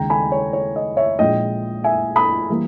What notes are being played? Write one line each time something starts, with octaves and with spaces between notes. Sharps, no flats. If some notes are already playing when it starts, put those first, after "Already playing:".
Already playing: D#2 C#3 G#3 G5 A#5
G#5 B5
C#5
C#5
D#5
C#5 E5
A#1 A#2 G#3 D#5 G5
E5 G#5
B5 D#6
E3 G3 A#3